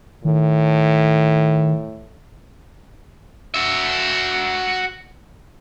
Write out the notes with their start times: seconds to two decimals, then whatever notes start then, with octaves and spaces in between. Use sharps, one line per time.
0.25 A2 D#3
3.54 F#4 E5